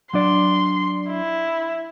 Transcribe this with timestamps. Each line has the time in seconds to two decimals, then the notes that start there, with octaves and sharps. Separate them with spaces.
0.13 F#3 D4 D5 C6
1.10 E4